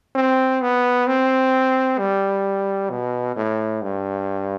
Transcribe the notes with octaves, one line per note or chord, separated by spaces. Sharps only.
C4
B3
C4
G3
B2
A2
G2